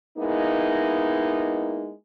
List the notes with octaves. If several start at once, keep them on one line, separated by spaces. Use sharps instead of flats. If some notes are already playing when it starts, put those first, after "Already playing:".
G#3 A#3 B3 D#4 E4